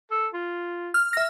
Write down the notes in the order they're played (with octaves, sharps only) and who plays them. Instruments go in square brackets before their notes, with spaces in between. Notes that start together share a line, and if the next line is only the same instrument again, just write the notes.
[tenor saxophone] A4
F4
[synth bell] F6
E5 A#6